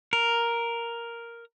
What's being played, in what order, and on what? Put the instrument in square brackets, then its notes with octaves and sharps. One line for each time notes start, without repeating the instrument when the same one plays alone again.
[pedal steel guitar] A#4